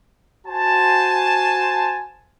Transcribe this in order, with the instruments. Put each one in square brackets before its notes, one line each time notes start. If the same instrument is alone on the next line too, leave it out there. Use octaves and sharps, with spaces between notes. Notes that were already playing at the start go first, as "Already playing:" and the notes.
[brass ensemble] F#4 C5 G#5 A5